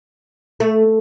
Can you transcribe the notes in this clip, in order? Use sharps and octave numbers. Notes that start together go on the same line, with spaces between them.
A3